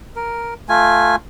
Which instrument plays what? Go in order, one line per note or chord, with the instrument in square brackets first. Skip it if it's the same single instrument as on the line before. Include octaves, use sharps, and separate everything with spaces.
[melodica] A#4
A3 F4 G#5